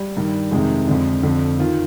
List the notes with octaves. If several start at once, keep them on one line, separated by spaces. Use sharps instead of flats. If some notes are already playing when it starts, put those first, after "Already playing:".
Already playing: G3
G2 D#3
F2 C3 D#3 G#3
F2 D3
F2 D3
D#3 F4